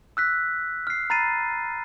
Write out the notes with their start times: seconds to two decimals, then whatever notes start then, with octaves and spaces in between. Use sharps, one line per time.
0.17 E6 F#6 B6
0.87 F6 C7
1.10 A#5 B5 A6 C7 D#7